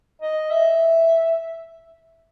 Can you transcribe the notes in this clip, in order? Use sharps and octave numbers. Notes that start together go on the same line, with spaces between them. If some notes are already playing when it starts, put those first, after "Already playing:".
D#5
E5